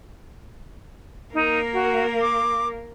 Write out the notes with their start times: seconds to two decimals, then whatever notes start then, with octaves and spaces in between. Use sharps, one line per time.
1.34 A#3 D#4 A#4
1.73 F#4
2.21 D6